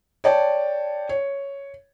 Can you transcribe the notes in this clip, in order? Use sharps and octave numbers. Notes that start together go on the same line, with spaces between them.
C#5 D5 G5 A5
C#5